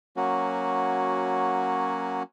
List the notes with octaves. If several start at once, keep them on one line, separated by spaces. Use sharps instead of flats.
F#3 A#3 C#4 F#4